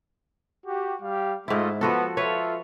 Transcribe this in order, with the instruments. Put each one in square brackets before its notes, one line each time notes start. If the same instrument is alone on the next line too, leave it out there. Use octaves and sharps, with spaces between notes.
[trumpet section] F#4 G4
G3 G4 F5
[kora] G#2 E4 [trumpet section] A3 F4 D#5
[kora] F3 F#4 A4 [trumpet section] B3
[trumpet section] F4 A4 E5 [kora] B4 C#5